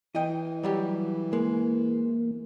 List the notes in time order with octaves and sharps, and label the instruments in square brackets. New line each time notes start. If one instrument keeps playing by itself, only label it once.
[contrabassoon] E3 [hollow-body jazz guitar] D#5 G5
[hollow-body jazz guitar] F#3 G3 G4
[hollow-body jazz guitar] G#3 [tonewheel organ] A#3